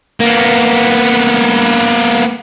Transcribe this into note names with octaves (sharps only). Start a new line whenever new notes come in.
A#3 B3